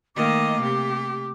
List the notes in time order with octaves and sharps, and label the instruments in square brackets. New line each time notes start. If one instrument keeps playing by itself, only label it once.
[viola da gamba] D#3 A3 A#3 [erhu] D#5 [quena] D6
[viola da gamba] C3 [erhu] G4